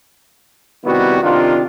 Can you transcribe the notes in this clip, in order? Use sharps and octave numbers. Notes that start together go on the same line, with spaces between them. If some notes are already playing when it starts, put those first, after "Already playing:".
C3 D#3 G3 B3 E4 F#4
C3 D#3 D4 F4